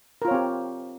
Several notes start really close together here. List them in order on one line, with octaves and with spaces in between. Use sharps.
A#4 F4 C#5 C4 G4